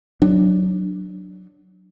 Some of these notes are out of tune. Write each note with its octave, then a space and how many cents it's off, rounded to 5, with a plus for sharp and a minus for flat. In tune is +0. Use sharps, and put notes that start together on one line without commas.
F#3 +0 D4 +15